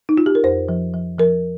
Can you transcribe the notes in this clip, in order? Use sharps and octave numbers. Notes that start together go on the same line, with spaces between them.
D#4
F4
G4
A#4
F2 C5
F3
F3
F3 A#4